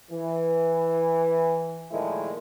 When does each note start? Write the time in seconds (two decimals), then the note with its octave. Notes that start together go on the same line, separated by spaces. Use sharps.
0.11 E3
1.92 A#2 D#3 F3 G#3 A3 E4